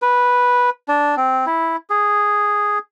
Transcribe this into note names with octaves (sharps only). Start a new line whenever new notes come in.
B4
D4
C4
E4
G#4